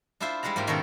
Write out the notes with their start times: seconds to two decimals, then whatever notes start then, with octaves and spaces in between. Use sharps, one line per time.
0.20 D4 E4 F4 C5 E5
0.43 G3 G#3 E4 F#5 A#5
0.56 G#2 A#3 E4 F4 G4
0.67 B2 D#3 C#4 E4 A4 A#4